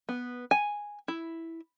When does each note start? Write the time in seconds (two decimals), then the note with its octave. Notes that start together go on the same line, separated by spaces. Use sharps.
0.09 B3
0.51 G#5
1.08 E4